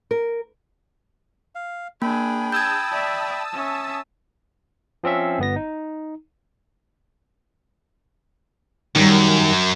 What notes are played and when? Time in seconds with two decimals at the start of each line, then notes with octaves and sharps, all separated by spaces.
0.11 A#4
1.55 F5
2.02 A#3 D4 G#4 G5 B5
2.52 A5 D#6 E6 G6 G#6
2.92 D5 E5
3.53 C#4 E5
5.04 F3 C4 C#4 E5
5.39 G1 B3 A#6
5.56 D#4
8.96 F#2 D#3 G3